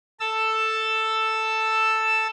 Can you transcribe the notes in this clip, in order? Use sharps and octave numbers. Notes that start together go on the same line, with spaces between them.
A4 A5 E6